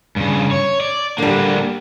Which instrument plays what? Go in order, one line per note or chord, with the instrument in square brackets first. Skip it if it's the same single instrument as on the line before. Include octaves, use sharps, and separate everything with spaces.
[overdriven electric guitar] G2 C#3
C#5
D5
[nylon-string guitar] D3 G3 [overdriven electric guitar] A#3 D4